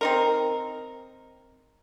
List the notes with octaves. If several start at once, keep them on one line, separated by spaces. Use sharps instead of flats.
C4 D#4 A#4